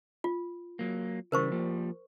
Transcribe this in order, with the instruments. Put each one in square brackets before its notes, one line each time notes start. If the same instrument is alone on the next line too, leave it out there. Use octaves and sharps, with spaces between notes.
[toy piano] F4
[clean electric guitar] F#3 A#3
[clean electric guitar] C#3 E3 G3 [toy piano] A#4 C5 C#6
[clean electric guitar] F3 G3 A#3